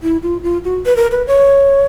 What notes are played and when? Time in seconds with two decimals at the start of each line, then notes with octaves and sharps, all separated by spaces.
0.03 E4
0.23 F4
0.43 F4
0.64 F#4
0.86 B4
0.96 A#4
1.12 B4
1.27 C#5